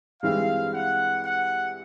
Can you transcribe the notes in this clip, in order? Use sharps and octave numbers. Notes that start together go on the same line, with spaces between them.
G2 E3 G#3 C4 F5
F#5
F#5